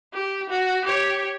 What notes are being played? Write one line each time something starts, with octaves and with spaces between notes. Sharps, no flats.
G4
F#4
G4 C#5